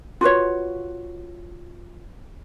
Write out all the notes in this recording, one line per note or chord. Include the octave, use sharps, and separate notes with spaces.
F4 F#4 B4 C#5